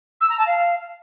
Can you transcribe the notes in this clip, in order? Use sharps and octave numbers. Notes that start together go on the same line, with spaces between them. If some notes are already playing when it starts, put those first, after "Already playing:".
E6
A#5
A5
F5